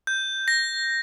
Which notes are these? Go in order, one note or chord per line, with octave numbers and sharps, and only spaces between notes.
G6
A#6